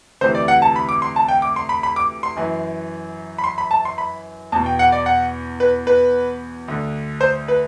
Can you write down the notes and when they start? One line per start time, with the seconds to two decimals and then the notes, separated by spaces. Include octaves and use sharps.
0.21 D2 C3 E3 C5
0.35 D5
0.48 F#5
0.62 A5
0.76 B5
0.89 D6
1.02 C6
1.16 A5
1.28 G5
1.42 D6
1.56 C6
1.69 B5
1.83 B5
1.96 D6
2.23 C6
2.36 F#2 E3
3.38 B5
3.44 C6
3.58 B5
3.71 A5
3.85 C6
3.98 B5
4.52 E2 B2 A5
4.66 G5
4.79 F#5
4.92 D5
5.06 F#5
5.60 B4
5.87 B4
6.68 D2 D3
7.21 C5
7.48 B4